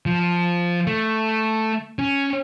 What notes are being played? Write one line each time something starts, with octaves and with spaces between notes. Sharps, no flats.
F3
A3
C#4